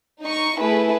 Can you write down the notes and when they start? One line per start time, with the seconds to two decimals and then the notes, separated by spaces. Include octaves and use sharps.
0.21 D#4 C#6
0.59 A3 E4 G#4 B4